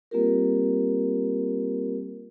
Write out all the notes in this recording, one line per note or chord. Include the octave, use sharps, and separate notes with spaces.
G3 A#3 C4 F4 G4 A#4